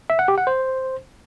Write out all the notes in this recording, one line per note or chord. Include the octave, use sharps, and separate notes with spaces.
E5
F#5
G4
F#5
C5